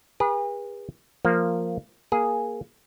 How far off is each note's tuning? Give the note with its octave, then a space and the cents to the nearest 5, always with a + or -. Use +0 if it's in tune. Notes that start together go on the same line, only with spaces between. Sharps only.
G#4 -40 B4 -35
F3 +0 A#3 -10
A#3 +10 G#4 +0